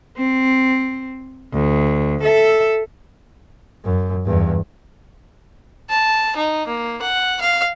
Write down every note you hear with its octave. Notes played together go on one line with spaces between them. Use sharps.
C4
D2
A4 E5
F#2
E2 G2
A5
D#4
A#3
F#5
F5